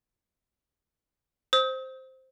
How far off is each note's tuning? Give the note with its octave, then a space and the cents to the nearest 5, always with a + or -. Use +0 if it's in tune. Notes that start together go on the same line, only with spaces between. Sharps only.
C5 +0 D#6 +45